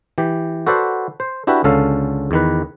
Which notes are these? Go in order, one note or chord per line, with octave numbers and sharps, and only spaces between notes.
E3 G4
F#4 A4 B4 C5 D5 F#5
C5
D4 E4 F#4 G4 B4
C#2 D3 C#4 A4 F5
E2 D#3 B4